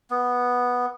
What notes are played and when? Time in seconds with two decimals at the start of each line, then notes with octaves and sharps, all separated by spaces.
0.11 B3